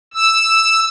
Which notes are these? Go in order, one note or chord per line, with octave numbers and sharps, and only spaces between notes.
E6